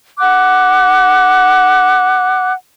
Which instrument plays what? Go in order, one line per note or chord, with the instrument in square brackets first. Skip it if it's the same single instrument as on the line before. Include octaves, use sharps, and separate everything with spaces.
[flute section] F#5 D6 F#6